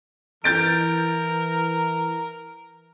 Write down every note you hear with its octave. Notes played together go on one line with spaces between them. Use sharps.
E3 A#4 G6 A6 D7